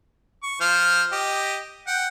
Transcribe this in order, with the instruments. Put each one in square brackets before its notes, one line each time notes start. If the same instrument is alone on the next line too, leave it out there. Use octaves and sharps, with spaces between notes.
[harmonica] C#6
F3 C5 F6
G4 D#5
F#5 G5